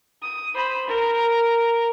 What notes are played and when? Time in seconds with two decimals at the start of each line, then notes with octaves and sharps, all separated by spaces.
0.22 D#6
0.54 C5 B5
0.87 A#4